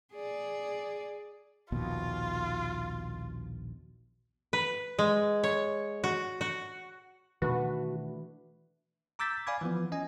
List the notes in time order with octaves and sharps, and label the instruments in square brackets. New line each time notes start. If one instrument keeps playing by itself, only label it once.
[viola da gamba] G#4 D5
[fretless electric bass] A#1 D#2 B2 [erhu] F4
[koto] B4
G#3
C#5
F#4
F#4
[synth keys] B2 D#3 [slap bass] E3 A3 D4 [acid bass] F#4 [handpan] B4
[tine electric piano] A#5 D6 E6 G6 A6 B6
D5 F5 G#5 B5 D6 G#6
E3 F3 B3
C#4 D#5 G#5